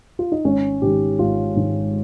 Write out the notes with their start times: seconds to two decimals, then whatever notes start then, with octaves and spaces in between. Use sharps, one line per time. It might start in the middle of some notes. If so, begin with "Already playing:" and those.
0.19 F4
0.32 D#4
0.44 G#1 C#4
0.82 G#2 D#3 G4
1.19 G#1 F4
1.56 G#2 D#3